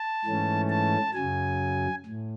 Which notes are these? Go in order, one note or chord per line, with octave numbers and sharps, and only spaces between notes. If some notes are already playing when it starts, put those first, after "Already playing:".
Already playing: A5
G#2 E3 A3 C#4
A5
F#2 C#3 F#3 G#5
A2